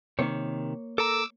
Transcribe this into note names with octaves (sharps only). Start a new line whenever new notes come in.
C3 D#3 A#3 C#5
A4 A#4 A#5 D6 E6